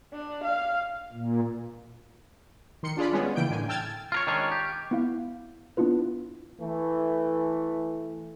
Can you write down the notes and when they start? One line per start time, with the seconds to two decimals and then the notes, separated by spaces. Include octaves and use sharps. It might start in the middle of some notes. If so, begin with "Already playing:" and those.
0.13 D4
0.44 F5
1.12 A#2
2.83 D#3 C6 C#7
2.97 D4 F4 G#4 D5 B5
3.12 G3 G#3 B3 C#4 G#4
3.36 C#3 E3 A#3 G5 G6 D7
3.50 A2 D3 G#5
3.68 G5 A5 E6 F6 G#6 A6
4.12 F4 A#4 C#5
4.27 D#3 G#3 C#4 D4 F4 C#5
4.52 G4
4.91 B3 E4 F5
5.77 B3 D4 E4 F4 B4
6.61 E3 A3